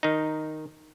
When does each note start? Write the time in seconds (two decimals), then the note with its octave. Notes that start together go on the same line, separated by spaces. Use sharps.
0.03 D#3 D#4